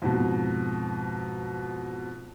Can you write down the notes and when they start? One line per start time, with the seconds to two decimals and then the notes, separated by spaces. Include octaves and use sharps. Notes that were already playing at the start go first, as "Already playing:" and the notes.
0.02 F2 G#2 B2